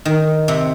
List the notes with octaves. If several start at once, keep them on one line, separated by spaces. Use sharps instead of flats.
D#3
C3